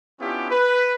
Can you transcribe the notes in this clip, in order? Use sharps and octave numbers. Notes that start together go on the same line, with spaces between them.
B3 C#4 D4 E4 F4 G4
B4